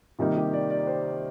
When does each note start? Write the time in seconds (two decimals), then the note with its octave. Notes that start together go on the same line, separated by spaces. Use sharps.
0.19 C3 D#3 G3 A#3 D#4 F4
0.37 G4
0.53 D5
0.70 D5
0.87 C5